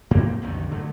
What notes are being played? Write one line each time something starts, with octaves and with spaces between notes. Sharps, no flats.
G#2 A#3 C4
B1 F2 D3 D#3
D3 F#3 A3